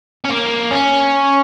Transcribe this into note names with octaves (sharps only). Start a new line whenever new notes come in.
C#4
A#3
C#4